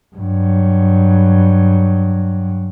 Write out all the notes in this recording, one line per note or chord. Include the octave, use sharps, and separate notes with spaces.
G2 F#3